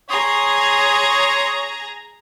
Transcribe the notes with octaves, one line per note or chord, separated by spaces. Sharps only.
G#4 C#5 A#5 C6 D#6